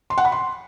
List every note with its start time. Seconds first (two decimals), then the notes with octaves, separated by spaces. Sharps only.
0.10 C6
0.18 F#5
0.25 B5
0.32 C6